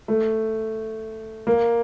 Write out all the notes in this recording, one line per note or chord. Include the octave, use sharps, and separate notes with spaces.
A3
A#3